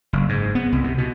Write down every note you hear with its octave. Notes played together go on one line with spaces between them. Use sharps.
F#1
G#2
B3
C2
C3
B2